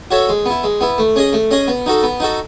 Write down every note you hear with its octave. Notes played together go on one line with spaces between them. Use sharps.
F#4 A4 C#5 E5
G#3
B3 E4
G#3
B3 E4
A3
C#4 G#4 D#5
A3
C#4 G#4 D#5
B3
D#4 F#4 A4
B3
D#4 F#4 A4